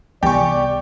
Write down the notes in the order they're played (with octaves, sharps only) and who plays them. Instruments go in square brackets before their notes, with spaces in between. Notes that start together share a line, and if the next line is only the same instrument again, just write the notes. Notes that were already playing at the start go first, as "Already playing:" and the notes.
[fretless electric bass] C2 E3 [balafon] B3 [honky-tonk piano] G4 C#6 [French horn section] D5